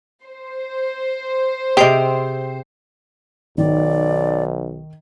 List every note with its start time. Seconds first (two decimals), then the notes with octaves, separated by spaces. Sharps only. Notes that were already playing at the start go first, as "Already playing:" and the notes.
0.23 C5
1.77 C3 C4 G4 G#4 D#5 G5 C7
3.58 B1 D#3 D5